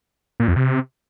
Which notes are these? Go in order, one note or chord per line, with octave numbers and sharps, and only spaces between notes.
A#2
F2
C3